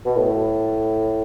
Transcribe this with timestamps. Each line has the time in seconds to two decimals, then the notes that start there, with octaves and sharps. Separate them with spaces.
0.06 B2
0.17 A2